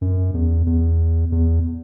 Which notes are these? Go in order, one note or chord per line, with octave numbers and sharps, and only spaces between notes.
F#2
E2
E2
E2